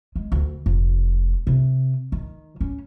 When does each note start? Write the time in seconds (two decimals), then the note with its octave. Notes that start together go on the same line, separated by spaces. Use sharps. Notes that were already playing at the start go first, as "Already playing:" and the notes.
0.16 G#3
0.32 D2
0.66 F1
1.47 C3
2.12 D#3
2.61 C#4